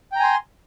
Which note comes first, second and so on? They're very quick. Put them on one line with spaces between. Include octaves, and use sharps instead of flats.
G5 A#5 G#5 C6